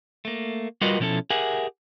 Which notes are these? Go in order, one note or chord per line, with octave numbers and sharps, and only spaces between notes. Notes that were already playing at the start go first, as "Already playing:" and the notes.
A3 A#3
G3 F4 F#4 A#4 B4 D#5
B2 F3 C#4 E4 A4
G4 G#4 A#4 E5 F#5 G#5